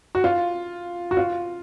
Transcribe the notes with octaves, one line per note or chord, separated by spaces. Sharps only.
F#4
F4
F#4
F4